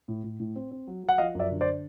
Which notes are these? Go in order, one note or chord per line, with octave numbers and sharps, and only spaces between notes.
A2
A2
A2
C4
C4
F#3
F#3
F#5
F3 D#5 F5
F#2 D5 E5
D3
C5 D5